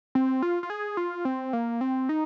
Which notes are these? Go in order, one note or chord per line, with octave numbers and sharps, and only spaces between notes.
C4
F4
F4
G#4
F4
C4
A#3
C4
D#4